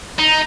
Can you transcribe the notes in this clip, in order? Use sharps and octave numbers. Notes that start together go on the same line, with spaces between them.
D#4